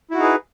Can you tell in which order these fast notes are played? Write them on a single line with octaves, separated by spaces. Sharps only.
E4 F#4 D#4 G#4 B4